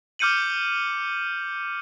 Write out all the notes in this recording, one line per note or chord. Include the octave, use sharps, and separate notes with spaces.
D6 F6 G6 C#7 D#7 F#7